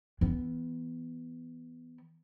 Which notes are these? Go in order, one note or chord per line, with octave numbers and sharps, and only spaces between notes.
E3 B3